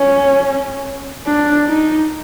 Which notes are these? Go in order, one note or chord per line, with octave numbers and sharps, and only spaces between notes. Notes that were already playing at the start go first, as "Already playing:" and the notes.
Already playing: C#4
D4
D#4